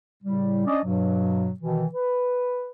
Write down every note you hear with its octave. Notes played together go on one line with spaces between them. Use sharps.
A2 C#3 G3
C#4 D4 D5 D#5
G2 B2 F#3
B2 D#3 E3
B4